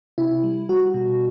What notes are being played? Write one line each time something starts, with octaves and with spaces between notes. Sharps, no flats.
C3 E4
G3
G3 F#4
B2